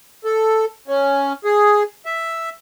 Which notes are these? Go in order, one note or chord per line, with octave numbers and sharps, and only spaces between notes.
A4
C#4
G#4
E5